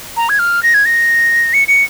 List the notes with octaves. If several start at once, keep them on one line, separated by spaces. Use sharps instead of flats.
A#5
G#6
F6
A#6
G#6
A#6
C#7
C#7